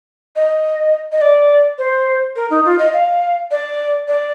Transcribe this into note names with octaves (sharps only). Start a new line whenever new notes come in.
D#5
D#5
D5
C5
A#4
D#4
F4
D#5
F5
D5
D5